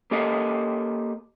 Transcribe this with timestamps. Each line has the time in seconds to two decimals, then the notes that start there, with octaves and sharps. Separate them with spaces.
0.11 A#3 G4 A4 D#5